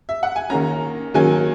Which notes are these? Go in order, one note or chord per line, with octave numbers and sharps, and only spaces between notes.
E5
F#5
G#5
D#3 A#3 C#4 A#5
D#3 F#3 A#3 C#4 G#5